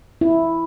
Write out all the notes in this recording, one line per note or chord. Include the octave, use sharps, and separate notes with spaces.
E4